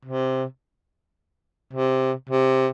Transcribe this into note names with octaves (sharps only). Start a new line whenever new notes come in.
C3
C3
C3